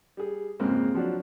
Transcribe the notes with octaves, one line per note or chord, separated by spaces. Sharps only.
G3 G#4
F2 G#2 C#3 G#3 A#3 C4
F3 F#3 D4